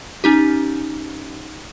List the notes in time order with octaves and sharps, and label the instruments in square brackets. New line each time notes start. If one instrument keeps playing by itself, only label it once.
[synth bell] C#4 D#4 G4